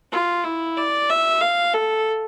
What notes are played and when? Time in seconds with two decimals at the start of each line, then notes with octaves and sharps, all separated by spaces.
0.12 F4
0.44 E4
0.77 D5
1.09 E5
1.41 F5
1.74 A4